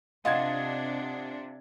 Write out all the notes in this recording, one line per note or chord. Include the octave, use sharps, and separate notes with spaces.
C3 D4 F4 D#5 F#5 A5 G#6